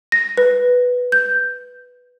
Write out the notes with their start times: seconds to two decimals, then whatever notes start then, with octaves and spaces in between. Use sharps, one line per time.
0.12 A#6
0.37 B4
1.12 G6